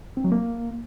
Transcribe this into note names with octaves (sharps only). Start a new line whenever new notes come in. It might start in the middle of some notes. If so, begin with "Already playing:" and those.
C4
F#3
A#3